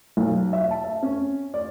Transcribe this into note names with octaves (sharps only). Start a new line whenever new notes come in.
B1
E5
A5
E5
C#4
D5